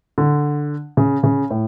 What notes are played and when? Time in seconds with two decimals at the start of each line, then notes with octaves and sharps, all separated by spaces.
0.18 D3
0.97 C#3
1.23 C#3
1.51 A2